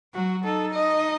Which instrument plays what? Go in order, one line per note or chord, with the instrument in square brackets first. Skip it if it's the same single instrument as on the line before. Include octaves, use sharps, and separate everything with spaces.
[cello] F#3 [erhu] F#4
[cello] D#4 [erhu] A4
[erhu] D#5